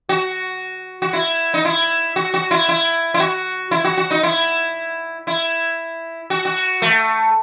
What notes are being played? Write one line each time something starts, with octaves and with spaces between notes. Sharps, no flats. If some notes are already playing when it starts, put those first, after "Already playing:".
F#4
F#4
E4
D#4
E4
F#4
F#4
E4
E4
E4
F#4
E4
F#4
F#4
D#4
E4
E4
F#4
F#4
A3